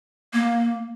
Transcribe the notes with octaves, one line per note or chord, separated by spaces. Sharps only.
A#3